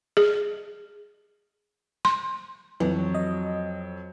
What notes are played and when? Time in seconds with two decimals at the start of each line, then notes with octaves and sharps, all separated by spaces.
0.17 G#4
2.05 C6
2.80 F2 E3 F#3
3.15 D#5